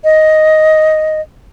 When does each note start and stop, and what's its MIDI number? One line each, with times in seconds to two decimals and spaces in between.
0.04 1.21 75